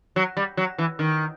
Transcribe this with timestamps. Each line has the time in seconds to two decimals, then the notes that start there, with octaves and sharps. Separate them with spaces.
0.16 F#3
0.37 G3
0.57 F#3
0.78 E3
0.99 D#3